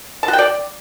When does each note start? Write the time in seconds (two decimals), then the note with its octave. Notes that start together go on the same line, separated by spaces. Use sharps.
0.23 A5
0.28 F#4
0.33 G5
0.39 D5